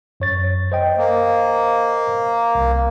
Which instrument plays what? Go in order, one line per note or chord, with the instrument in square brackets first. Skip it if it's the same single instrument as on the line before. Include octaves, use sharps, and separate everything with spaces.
[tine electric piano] F#2 C#5 A6
C5 D#5 G5
[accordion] A#3
[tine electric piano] C2